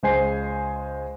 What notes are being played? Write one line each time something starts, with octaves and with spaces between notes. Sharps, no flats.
C#2 G#3 C5 G#5 C7